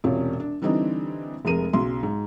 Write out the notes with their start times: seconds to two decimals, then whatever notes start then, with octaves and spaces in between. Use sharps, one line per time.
0.04 E1 C3 C#4 F4
0.40 D4
0.62 D3 E3 G3 C4 D4 D#4
1.45 F1 F2 G#3 A#4 D#7
1.73 B1 C#3 C6
2.03 G#2